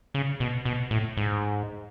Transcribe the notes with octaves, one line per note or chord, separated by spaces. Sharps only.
C#3
B2
B2
A2
G#2